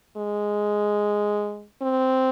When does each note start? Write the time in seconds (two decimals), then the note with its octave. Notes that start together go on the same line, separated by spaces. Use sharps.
0.17 G#3
1.82 C4